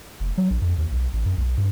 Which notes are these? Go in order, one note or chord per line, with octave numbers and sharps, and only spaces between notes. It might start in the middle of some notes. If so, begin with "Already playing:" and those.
F1
F#3
A#1
F2
D#2
B1
A1
F#2
B1
G2